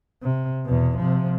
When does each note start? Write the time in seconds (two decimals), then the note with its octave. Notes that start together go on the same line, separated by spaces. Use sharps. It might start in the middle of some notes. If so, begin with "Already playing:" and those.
0.23 C3
0.66 E2 B2
0.97 C3 F3